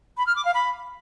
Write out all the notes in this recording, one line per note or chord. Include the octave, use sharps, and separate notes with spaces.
B5
F6
D6
F5
B5